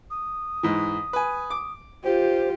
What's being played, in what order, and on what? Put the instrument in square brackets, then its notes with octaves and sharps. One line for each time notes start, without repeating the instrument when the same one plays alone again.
[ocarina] D#6
[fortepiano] G#2 E3
B4 G#5
D6
[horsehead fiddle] F4 G4 [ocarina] C5